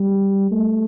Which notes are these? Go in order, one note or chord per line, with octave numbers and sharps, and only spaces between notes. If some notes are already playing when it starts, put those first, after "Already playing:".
Already playing: G3
A3